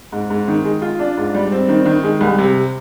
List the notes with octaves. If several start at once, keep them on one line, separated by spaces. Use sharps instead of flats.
G#2
G#2
D#3
G#3
F4
D4
G#2
G3
C4
D#3
D#3
G#3
C2
C3